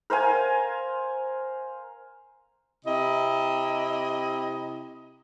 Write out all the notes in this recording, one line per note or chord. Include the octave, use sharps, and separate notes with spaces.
A#4 C5 F5 G#5
C3 E4 D#5